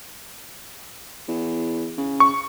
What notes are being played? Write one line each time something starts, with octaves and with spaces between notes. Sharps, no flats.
E2
C#3
C#6